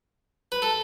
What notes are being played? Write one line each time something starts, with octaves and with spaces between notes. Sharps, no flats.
B4
A4